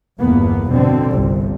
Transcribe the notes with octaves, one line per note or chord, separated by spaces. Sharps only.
G1 E2 G2 A#3 B3
B2 D3 C4
G1 C2 G2